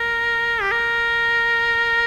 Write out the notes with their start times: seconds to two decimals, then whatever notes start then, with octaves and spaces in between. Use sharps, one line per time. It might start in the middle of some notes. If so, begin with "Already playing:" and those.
Already playing: A#4
0.61 G4
0.72 A#4